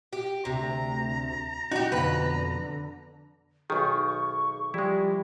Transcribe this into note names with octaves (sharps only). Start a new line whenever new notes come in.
G4
D2 C3 A#5
D#4 F#4 G4
F2 B2 D3 B4
B1 D#3 G#4 C#6
F3 G3 G#3 E4